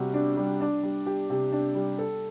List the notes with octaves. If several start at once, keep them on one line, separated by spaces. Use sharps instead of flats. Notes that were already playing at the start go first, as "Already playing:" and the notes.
Already playing: C3 G3 F#4
D4
G3
D4
G3
G4
C3
D4
G3
A4